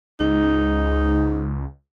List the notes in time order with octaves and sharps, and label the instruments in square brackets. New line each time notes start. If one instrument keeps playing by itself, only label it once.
[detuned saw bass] C#2 [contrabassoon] G#2 [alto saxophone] D#4